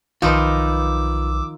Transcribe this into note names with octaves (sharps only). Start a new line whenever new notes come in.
B1 D#3 F3 D#4 F4 B4 D6 E6